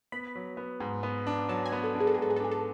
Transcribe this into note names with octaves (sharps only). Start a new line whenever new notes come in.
B3 B5
F#3
B3
G#2
B3
D4
F#3 A5
G#5
B3
A4
D4
G#4
A4
G#4
G#2 A4
G#4
A4
D4 G#4
A4